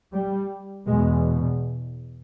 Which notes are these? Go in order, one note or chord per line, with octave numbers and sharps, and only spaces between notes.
G3
E2 B2 G#3